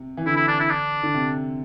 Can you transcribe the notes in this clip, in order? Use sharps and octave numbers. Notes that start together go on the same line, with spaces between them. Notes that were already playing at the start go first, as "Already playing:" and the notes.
Already playing: C3
E3
D3 E4
E4
D4
E4
D4
D3
C3